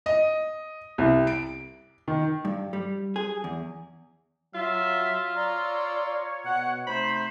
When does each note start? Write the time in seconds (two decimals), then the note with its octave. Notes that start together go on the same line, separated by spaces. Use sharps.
0.06 D#5
0.98 C2
1.27 D7
2.08 D#3
2.45 G2
2.73 G3
3.16 G#4
3.44 E2
4.55 F#3 F4 E5
5.36 C#5 D5 A#5 E6
6.45 B2 F#5
6.87 C3 A3 D#4 C5 B5